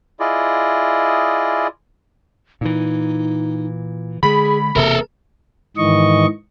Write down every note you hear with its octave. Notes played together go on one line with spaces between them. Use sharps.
E4 F4 G#4 D5 D#5
A#2 E3 D#4
D3 G#3 G#4 B5
E1 C3 A#3 A4 A#4 E5
G#2 D#3 E3 D#5 C#6